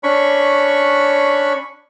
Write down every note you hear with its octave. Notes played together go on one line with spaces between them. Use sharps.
C#4 D4 B5 C#6